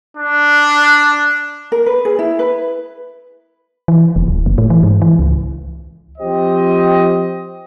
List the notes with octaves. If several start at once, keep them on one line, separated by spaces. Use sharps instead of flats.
D4
A#4
B4
G#4
E4
B4
E3
F1
D1
F#1
A2
E3
G#2
E3
C#2
F3 C4 G4 C5 D#5